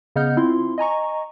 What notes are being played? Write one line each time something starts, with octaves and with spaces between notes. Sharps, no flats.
C#3 B3 D#5 F#5 F6 G6
C4 E4 F4 C6
D#5 G#5 A#5 C#6